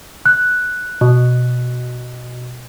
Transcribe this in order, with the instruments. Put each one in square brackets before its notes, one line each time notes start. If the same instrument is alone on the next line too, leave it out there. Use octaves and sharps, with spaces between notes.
[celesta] F#6
[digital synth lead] B2